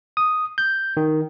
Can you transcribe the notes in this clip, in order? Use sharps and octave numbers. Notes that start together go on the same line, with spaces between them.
D#6
G6
D#3